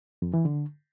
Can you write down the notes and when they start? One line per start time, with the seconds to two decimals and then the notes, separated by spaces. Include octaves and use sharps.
0.22 F2
0.34 E3
0.45 D3